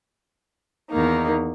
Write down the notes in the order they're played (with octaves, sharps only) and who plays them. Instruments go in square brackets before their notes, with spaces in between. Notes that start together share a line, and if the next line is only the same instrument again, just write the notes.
[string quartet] E2 D#3 A#3 D#4